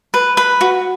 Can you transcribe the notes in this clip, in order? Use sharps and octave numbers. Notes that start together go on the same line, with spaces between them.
B4
B4
F#4